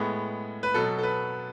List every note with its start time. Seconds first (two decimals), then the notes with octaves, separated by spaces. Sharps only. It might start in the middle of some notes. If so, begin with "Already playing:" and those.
Already playing: A2 G#3 B3
0.63 B4
0.74 B2 F#3 B3 A4
0.98 A4
1.03 B4